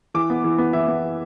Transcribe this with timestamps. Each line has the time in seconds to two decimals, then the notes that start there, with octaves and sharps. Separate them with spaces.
0.14 E3 D6
0.30 B3
0.44 E3
0.58 B3
0.73 E3 E5
0.88 B3